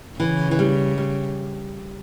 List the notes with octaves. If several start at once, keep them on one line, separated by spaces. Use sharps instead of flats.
C#3 E3
E3
G3
G3